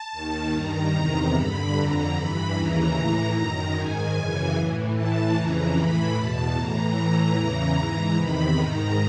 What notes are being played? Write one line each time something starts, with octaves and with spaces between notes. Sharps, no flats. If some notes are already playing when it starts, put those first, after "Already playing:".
Already playing: A5
D#2 D#3
G2 D#3 A#5
E2 C3 D#3
G2 D3 B5
F2 D3 A#5
G2 E3 B5
D#2 C#3 E3 A#5
A2 E3
F#2 D#3
G#2 D#3 G#5
F#2 C#3 E3
A2 E3
A2 E3 A5
F2 C#3 E3 A#5
A2 E3 B5
E2 B2 A5
A2 E3 A#5
A2 E3 A#5
E2 C#3 E3
G#2 E3
E2 C3 D#3 B5
G#2 D#3 A#5